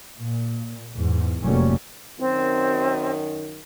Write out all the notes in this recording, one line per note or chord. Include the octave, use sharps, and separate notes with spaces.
A#2
E2 G#2
F1 A2 F#3 G3 A#3 C#4
F#2 D#3 C4